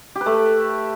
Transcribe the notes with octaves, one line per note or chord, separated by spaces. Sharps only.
G4
B4
A3